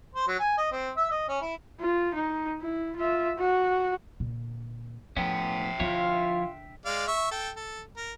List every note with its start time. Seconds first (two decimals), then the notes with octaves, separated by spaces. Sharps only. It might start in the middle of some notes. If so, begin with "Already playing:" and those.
0.15 C5
0.28 F#3
0.39 G#5
0.58 D#5
0.72 C4
0.97 E5
1.11 D#5
1.28 C#4
1.41 E4
1.80 F4
2.14 D#4
2.61 E4
2.96 F4 E5
3.38 F#4
4.20 A#2 D3
5.17 A2 F3 B3 C#4 E5 G5
5.80 D3 F3 D4 E4 F4 C#5
6.85 G#3 D5 F5
7.08 E5 C#6
7.31 A4 G5
7.56 A4
7.97 A#4